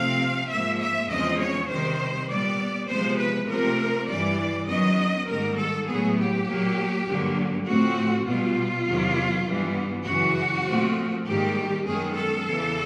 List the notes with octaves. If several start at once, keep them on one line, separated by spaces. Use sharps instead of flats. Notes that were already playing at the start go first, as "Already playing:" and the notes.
Already playing: C3 F3 A3 C4 F5
G#2 F3 A#3 E5
E5
E2 C#3 F3 G#3 C4 D#5
C#5
C3 D#3 G3 C5
A#2 G3 B3 D5
C3 F3 G#3 B3 C5
B4
C3 F3 A3 C4 A#4
G2 E3 G3 D5
F#2 D#3 F#3 B3 D#5
G#2 D#3 G3 A#3 A#4
A4
A2 F#3 B3 G#4
G4
A#2 F#3 A#3
G2 D3 F#3 A#3
A2 F3 A3 C4 F#4
B2 G3 B3 F4
E2 C3 D#3 F#3
G2 E3 G3 B3
F#2 C#3 E3 F#4
A#2 F3 A3 C4
G#2 D#3 G3 A#3 G4
F#2 D#3 G#3 B3 G#4
A4
E2 C#3 E3